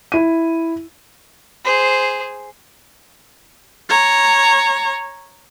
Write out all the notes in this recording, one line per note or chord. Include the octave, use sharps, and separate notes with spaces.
E4 D#7
G#4 C5
C#5 A#5